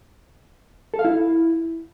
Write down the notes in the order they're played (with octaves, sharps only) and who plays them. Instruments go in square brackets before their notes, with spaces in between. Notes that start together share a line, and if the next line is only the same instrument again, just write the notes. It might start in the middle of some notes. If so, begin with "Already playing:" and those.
[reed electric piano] A4
F5
E4